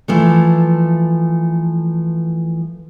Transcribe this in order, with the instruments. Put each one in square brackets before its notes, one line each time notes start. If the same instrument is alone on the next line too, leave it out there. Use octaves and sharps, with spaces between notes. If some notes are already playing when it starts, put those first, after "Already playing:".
[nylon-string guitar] E3 F3 A3